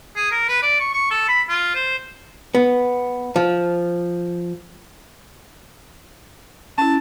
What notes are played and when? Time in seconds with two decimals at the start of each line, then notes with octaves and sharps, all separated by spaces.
0.16 G#4
0.31 A#4
0.48 B4
0.62 D5
0.79 C#6
0.93 C#6
1.11 A4
1.28 B5
1.49 F4
1.75 C5
2.55 B3
3.36 F3
6.78 C#4 E4 A5